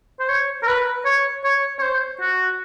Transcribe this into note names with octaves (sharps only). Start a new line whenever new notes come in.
C5
C#5
A#4
B4
C#5
C#5
C#5
C5
F#4